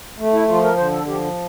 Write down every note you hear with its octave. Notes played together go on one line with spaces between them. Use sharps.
A3
E4
F3 F4
A#4
D3 C5
A4
F3 G4